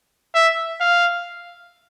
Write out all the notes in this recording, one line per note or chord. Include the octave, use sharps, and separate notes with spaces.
E5
F5